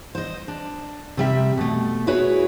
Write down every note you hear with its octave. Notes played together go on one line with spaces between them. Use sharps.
C5 D#5
D4
C3 G3 E5
B2 A3
E4 F#4 G#4 B4 C#5